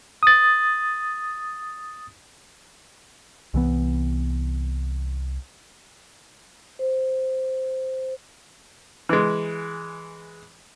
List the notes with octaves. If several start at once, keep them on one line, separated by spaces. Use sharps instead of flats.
D#6 A6
C2 E3 B3
C5
E3 G#3